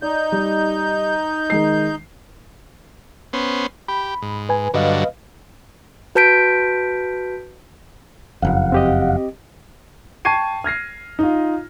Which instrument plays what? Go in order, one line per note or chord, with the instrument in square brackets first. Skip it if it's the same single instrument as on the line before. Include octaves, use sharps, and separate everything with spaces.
[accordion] D#4 G6 [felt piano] D5
[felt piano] G3
D#3 G#3 C7
[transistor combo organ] B3 C#4 C5
[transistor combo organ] G4 [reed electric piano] B5
[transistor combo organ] G#2
[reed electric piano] B4 G#5
[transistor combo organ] G2 D3 F#3 [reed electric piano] B4 D#5 F5
[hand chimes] F#4 B4 A5 G6 B6 D7
[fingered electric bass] F#1 F2 [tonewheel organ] F5 F#5
[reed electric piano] C4 G4 D#5
[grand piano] G5 A5 C#6 G#6 C7 D#7
F6 G#6 A#6 C7
D#4 F4